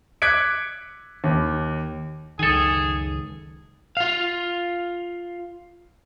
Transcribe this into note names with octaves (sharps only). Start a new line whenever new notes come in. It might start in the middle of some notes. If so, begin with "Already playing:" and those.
D6 F#6 G#6 B6 C#7 D7
D#2
C#2 F#2 D#3 G#4 A4 G#5
F4 F5